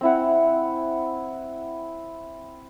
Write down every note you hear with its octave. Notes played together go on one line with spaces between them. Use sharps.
C4 E4 F#5